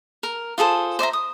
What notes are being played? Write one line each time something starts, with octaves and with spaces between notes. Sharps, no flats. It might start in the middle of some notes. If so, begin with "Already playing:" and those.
A#4
F4 G#4 A4 C5
C5 D5 E5 A#5
D#6